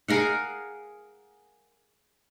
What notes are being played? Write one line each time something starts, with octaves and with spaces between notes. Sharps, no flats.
G#4 A#4 F5 F#5